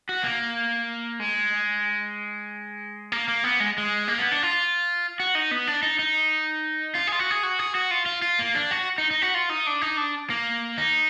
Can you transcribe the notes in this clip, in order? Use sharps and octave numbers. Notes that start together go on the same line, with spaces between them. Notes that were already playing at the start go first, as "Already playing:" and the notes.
F#4
A#3
G#3
A#3
A#3
B3
G#3
G#3
A#3
B3
D4
F4
F#4
D#4
B3
D4
D#4
D#4
F4
G#4
F4
F#4
G#4
F#4
G#4
F#4
F4
F4
F4
A#3
D4
F#4
D#4
D#4
F#4
F4
D#4
D4
D#4
D4
A#3
D#4